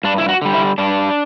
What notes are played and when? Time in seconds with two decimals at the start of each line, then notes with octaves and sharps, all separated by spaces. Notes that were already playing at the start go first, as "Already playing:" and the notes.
0.04 G2 D4
0.18 E4
0.29 F#4
0.42 D3 G3
0.54 E4
0.78 G2 D4